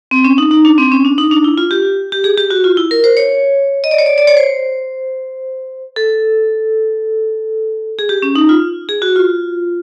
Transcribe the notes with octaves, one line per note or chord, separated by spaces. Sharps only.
C4
C#4
D#4
D#4
D4
C4
C#4
D4
D#4
D4
E4
F4
G4
G4
G#4
G4
F#4
F4
E4
A#4
C5
C#5
D#5
D5
C#5
D5
D5
C#5
C5
A4
G#4
G4
C#4
D#4
F4
G#4
F#4
F4